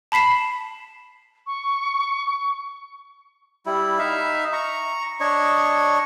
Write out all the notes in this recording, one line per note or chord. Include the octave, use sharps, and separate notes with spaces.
A5 B5 B6 C7 E7
C#6
G3 E4
D#4 E5 F5
A#5 C#6
D4 C#5 D#5 C#6